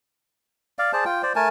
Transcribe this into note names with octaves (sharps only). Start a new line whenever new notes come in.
D5 F5
G#4 C5 D5 A5
F4 G5
C5 D5
A3 A#4 G#5 A5